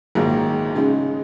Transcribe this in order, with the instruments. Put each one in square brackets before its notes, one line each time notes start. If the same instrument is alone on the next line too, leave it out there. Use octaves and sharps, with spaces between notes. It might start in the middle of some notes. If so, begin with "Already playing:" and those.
[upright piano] A#1 G#2 D#3 F#3 A#3
C#3 G#3 D#4